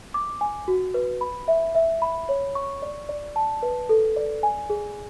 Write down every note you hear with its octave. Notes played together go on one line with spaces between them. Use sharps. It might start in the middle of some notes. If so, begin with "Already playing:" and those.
D6
G#5
F#4
B4
B5
E5
E5
B5
C#5
C#6
D5
D5
A5
B4
A4
D5
G#5
G#4